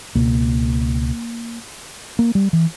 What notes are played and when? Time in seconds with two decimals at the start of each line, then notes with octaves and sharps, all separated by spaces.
0.15 C#2 B2 A#3
2.19 A#3
2.35 G3
2.53 E3